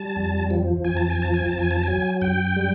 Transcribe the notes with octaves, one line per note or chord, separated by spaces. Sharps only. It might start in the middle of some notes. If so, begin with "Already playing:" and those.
Already playing: G3 A5
F2
F3
F2 G#5
A5
G#5
F3 A5
G#5
A5
F2
G#5
A5
F#3 G#5
F#2 G5
G3